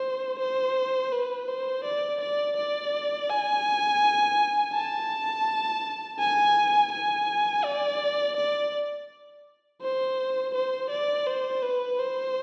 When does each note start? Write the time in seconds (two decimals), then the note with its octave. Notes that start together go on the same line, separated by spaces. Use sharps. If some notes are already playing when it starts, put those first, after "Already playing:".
Already playing: C5
0.39 C5
1.12 B4
1.48 C5
1.85 D5
2.21 D5
2.56 D5
3.29 G#5
4.74 A5
6.19 G#5
6.92 G#5
7.64 D5
8.37 D5
9.82 C5
10.54 C5
10.90 D5
11.27 C5
11.63 B4
11.99 C5